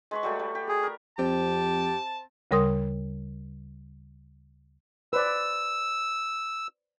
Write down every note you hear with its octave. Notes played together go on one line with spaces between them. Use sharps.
G#3 B4 C#6
F#3 G3 A3
G3
G4
G#4
A#4
F2 C4 G4 A5
D2 C#3 G3 A#4 C6 D#6
B4 C5 D5 E6